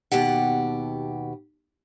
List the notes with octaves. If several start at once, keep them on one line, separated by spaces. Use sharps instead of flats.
D#2 B2 G4 F#5